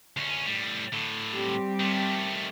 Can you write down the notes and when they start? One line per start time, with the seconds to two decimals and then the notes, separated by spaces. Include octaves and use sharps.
0.17 D2 C#4
0.46 A2 G3
0.93 A2 D3
1.34 G3 C4 G4
1.80 D#3 A3